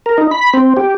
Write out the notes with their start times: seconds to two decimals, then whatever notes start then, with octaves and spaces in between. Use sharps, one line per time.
0.06 A#4
0.18 D#4
0.31 B5
0.54 C4
0.77 G4